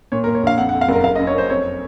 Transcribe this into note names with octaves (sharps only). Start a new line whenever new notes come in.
A#2 C#5
A#4
A#2
C#5
A#1 F5
F2 F#5
F#5
F2
F5
F#1 A#4
F#1 F5
D#5
F#2
C#5
F#2 C5
F2 C#5